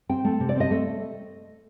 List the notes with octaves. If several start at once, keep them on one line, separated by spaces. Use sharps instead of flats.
C4 G5
A3
C3
D5
C4 D#5
A3